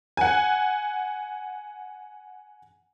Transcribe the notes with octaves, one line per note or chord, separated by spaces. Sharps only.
F#5 G#5